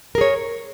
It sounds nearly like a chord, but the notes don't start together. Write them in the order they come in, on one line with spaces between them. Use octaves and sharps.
A#4 G#4 C#5